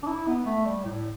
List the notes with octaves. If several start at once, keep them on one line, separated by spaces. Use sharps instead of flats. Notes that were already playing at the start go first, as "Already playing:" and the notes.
D4
E4
B3
A3
G3
A2